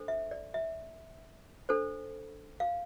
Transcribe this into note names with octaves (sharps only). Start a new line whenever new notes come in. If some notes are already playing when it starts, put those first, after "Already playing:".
Already playing: D4 A4 C5
E5
D5
E5
D4 A4 C5
F5